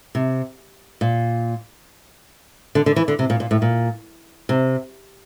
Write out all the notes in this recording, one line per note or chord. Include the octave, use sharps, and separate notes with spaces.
C3
A#2
D3
D3
E3
D3
C3
A#2
A#2
A2
A#2
C3